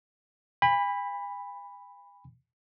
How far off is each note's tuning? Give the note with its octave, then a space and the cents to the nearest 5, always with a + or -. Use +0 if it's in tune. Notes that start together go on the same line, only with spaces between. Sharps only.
G#5 -45 B5 +0